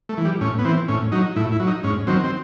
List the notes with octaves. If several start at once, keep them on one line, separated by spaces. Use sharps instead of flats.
A3
E3
G3
A2 C#4
B3
E3 C4
A2 C#4
F#3 D#4
A2 E4
E4
F#3
D#4
G#2 C#4
D#3 F#3 C4
C4